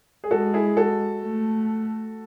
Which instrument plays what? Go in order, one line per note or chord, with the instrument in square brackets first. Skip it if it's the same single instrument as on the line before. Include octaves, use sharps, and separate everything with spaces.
[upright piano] G#4
[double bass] G#3 [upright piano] F#4 A4
[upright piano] E4 G#4
F#4 A4
[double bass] A3